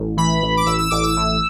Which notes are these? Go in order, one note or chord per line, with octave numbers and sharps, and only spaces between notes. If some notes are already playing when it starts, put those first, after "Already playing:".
Already playing: A1
E3 B5
A1
D6
A1 E6
E6
A1 D6
E6
A2